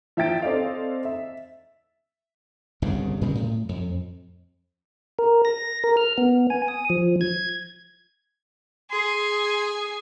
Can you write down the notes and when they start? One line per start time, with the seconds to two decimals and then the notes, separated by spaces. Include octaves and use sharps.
0.17 F3 E5 G5 A6 D7
0.42 C4 A4 D5 D#5 F5
1.05 E5
2.82 G1 C2 G2 C#3
3.21 A#2 C#3 G3 G#3
3.35 A2
3.69 F2
5.19 A#4
5.45 A#6
5.84 A#4
5.97 F6
6.18 B3
6.50 G#5
6.68 D#6
6.90 F3
7.21 G#6
8.91 G#4 C6